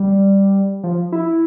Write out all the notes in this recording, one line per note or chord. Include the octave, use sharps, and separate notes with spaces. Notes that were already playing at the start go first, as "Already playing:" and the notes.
Already playing: G3
F3
E4